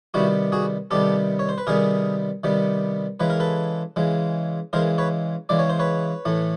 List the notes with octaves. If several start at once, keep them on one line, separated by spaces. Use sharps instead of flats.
C3 D#3 G3 B3 E4 F#4
F#4 G#4
C3 D#3 G3 B3 G4 A4
C#5
C5
B4
C3 D#3 G3 B3 G#4 A#4
C3 D#3 G3 B3
C#3 E3 G#3 B4
A#4
A4 B4
C#3 E3 G#3
C#3 E3 G#3 A#4 C5
B4 C#5
C#3 E3 G#3 D5
C#5
C5
B4 C#5
A2 E3 A3